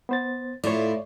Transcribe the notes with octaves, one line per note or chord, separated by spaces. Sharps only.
B3 C5 A6
A2 E4 F4 C#5 D5